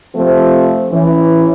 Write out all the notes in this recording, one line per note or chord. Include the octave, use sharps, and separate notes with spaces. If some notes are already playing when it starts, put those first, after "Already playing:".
C3 F3 A3 C4
E3 C#4